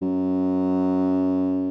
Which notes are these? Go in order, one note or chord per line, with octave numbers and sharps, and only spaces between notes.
F#2